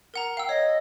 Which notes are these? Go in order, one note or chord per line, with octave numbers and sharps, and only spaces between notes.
A#4 F#5 A#5
F5 G5 E6
C#5 D#5